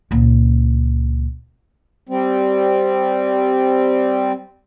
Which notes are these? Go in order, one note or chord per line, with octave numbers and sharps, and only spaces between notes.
C#2 A#2
G3 C4